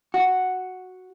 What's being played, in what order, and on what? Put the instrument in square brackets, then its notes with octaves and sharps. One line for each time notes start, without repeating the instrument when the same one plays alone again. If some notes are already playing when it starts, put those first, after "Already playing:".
[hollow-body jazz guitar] F#4